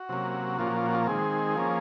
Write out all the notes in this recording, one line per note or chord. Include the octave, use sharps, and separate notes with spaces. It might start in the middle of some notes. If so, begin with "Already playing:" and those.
Already playing: F#4
C3 F#3 A#3 C#4
A#2 F3 A#3 C#4 F4
F#4
F4
F#4
F4
D#3 G#3 C4 G#4
F3 A#3 C#4